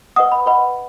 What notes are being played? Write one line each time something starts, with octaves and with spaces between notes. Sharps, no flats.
B4 D#5 F#5 D#6
B5
B4 D#5 F#5 B5